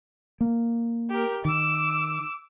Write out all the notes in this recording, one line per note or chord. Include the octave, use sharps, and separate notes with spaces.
A#3
G4 A#4
D#3 D6 E6